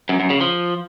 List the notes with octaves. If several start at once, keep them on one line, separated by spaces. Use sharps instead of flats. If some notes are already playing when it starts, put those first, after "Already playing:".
F#2
F#2
C#3
F3